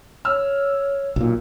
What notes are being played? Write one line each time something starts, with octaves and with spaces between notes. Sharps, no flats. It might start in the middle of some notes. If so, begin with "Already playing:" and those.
C#5 E6 F6
B1 A#2